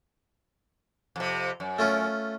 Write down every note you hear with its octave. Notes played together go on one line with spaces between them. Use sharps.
F2 C3
F#2
A3 C#4 F4